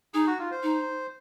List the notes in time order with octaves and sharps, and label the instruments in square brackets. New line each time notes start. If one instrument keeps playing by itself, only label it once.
[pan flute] D#4 [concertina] G#4
[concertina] F#4
F4
C5
[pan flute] D#4